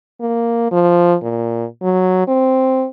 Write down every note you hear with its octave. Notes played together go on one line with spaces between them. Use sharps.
A#3
F3
A#2
F#3
C4